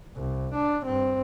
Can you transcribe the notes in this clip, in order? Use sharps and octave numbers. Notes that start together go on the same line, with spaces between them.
C2
D4
G2 C4